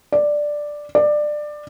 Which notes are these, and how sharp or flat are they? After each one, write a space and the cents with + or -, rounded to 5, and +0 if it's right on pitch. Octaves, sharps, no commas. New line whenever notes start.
D5 +5
D5 +20